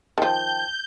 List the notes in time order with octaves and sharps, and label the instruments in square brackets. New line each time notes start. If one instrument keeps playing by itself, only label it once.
[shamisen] D#3 F3 [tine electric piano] G5 A5 [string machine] G6